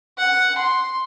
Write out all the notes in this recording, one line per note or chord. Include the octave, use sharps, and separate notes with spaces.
F#5
C6